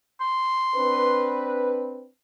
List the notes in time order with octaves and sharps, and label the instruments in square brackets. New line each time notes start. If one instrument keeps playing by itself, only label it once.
[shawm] C6
[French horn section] C4 D4 B4